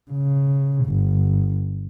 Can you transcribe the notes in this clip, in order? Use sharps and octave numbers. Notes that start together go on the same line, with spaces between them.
C#3
G1